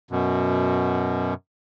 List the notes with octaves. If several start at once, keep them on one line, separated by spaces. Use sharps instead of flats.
F#2 B2